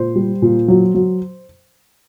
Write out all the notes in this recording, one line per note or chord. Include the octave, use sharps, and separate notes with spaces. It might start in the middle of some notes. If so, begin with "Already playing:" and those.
Already playing: A#2 C5
G3
A#2
F#3
F#3